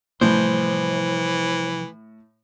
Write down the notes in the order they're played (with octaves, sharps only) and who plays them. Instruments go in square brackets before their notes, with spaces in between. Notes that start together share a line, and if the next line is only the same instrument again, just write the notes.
[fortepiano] A2 [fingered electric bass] C3 F3 G3 [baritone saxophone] E3 [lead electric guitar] C5